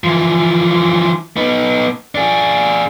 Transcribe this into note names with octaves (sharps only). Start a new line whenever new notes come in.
E3 F3
B3 D#4
D4 G#4